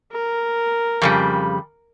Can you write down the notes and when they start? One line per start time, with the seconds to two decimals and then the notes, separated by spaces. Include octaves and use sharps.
0.12 A#4
1.02 F2 C#3 G3